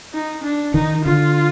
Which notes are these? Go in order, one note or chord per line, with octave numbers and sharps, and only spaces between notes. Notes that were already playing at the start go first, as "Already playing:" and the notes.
D#4
D4
D#3 D#4
D3 F4